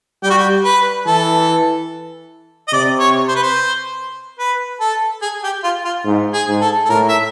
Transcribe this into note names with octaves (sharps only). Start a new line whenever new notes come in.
G3 G4
F#4
G4
B4
E3 A4
D#5
C3 D5
C#5
C5
B4
C5
B4
A4
G#4
G4
F4
F4
G#2
G#4
G#2
A4
A4
A2 A#4
E5